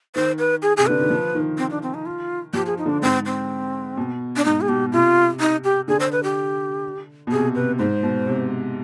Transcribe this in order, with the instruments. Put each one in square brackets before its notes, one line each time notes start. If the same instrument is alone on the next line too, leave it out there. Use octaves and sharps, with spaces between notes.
[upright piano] D#3 [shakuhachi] C5
[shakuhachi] B4
G#4
[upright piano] C3 [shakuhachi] G#4
[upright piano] D3 [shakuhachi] B4
[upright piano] D#3
F3
D#3
[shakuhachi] C4
D4
C4
D#4
F4
[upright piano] F3 [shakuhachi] G4
[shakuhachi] G#4
D#4
[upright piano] D3 [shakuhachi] D4
[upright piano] G#2 [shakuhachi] C4
[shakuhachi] C4
[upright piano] B2
[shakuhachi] D4
[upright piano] G#2 [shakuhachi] D#4
[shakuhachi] G#4
[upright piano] B2 [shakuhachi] G4
[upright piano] C3 [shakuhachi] F4
[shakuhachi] D#4
G4
[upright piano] D3 [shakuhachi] G#4
[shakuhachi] C5
B4
G4
[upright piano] B2
[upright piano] C3 [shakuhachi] G#4
[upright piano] C3 [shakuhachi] B4
[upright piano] G#2 [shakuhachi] C5
[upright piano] B2
C3